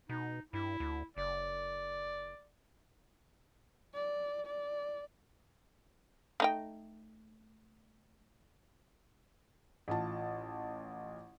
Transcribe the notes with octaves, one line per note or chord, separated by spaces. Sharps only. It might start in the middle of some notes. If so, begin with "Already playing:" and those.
B2 D#4
G2 E4
D2
F#1 D5
D5
D5
A3 D#4 G5
A1 F4 A5